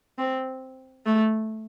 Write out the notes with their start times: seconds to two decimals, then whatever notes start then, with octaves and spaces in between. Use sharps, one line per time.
0.18 C4
1.06 A3